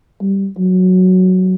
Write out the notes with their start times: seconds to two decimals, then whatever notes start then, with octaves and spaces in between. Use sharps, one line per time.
0.22 G3
0.58 F#3